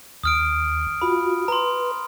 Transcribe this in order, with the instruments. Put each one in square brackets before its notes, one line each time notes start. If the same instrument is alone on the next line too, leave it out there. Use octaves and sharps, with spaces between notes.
[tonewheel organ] D#2 [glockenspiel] D#6 F6 D7
[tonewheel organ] F4 F#4 [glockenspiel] B5
[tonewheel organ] B4 [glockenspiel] A#5 C6